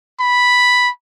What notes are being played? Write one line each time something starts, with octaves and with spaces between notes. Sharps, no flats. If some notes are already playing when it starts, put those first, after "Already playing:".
B5